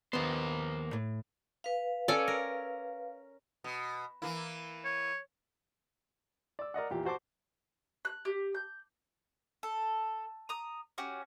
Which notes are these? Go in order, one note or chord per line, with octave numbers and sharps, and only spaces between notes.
D#2 A#3 B3 C5
A2
B4 F5
C#4 A4 C#5 D5 G#5
A#4
B2
E3 A#3 E4
C#5
D5 E6
A#4 D5 D#5 F#5
E2 A#2 G4
F#4 C5 A5 D6
F#6
G4
G6
A4
A#5 D#6
C#4 F#4 G4